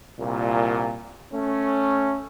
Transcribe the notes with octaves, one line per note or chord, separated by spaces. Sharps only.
C2 A#2
A3 C#4